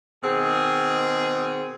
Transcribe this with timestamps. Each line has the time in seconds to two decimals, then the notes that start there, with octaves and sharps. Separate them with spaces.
0.24 B2 D#3 C4 G#4